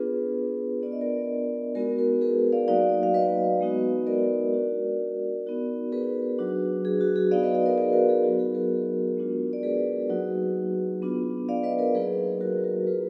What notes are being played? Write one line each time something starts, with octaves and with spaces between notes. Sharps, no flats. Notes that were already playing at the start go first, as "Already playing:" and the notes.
Already playing: B3 D4 F4 G#4 B4
B3 D4 F4 D5
D#5
A#4 D5
G#3 B3 D#4 F#4 A#4
F#4 A#4
G#4 B4
D5 F5
F#3 A#3 D#4 F#4 D5 F5
F5
B4 D#5
G#3 B3 D#4 F#4
A#4 D5
G#3 D4 F#4
B3 D#4 F#4
G#4 B4
F#3 D4 F#4
G#4
F#4
G#4
B3 D#4 F#4 D5 F5
B4 D#5
D5 F5
A#4 D5
G#4 B4
F#4 A#4
G#4
F#3 B3 D#4 F#4
G#4
F#4 A#4
G#3 B3 D4 F4
D5
G#4 B4
F#3 A#3 D#4 F#4
B3 D4 F4
D5 F5
B4 D#5
A#4 D5
F#3 A#3 D#4 G#4 B4
F#4 A#4
F#4 A#4
A#3 F4 G#4 B4